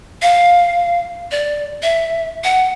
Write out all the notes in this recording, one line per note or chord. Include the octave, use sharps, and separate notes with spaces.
F5
D5
E5
F#5